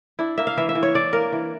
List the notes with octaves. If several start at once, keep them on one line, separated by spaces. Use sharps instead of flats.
D4 E4
A#3 E5
F5
E3 E5
E5
E3
C#5
D4 D5
A#3 A#4
E3